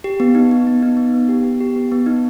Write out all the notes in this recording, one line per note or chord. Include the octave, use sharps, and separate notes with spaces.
G4
B3
D#4
D#4
B3
D#4
B3
B3
G4
B3
G4
B3
B3
D#4